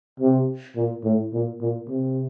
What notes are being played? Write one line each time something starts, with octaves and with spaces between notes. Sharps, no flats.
C3
A#2
A2
A#2
A#2
C3